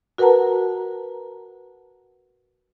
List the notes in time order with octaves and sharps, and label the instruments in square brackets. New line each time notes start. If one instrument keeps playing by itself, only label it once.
[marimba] F#4 A#4 B4 F#5 A5 A#5